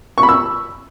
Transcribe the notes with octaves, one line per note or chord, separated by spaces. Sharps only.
C#6
B5
E6